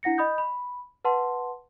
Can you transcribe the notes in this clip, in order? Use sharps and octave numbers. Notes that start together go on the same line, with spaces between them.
D4 E4 F#5 A#6 C#7
D#5 B5 D#6 G6
B5
B4 F#5 A5 C6